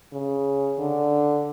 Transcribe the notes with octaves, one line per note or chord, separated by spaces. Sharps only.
C#3
D3